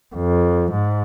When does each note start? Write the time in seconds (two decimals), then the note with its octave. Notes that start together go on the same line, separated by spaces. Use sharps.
0.15 F2
0.71 G#2